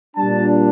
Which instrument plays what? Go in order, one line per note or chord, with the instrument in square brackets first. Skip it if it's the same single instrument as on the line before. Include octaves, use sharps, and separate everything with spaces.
[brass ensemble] A#2 G3 D4 A5